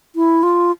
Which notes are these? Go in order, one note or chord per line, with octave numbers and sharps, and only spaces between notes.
E4
F4